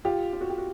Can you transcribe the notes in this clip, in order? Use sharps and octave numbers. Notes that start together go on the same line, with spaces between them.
F4 G4
F4
F#4
G4
F#4